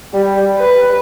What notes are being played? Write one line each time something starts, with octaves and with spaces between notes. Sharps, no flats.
G3
B4